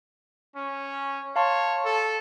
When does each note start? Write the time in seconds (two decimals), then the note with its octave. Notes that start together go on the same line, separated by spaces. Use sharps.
0.56 C#4
1.36 C#5 F5 A5 C6
1.85 A4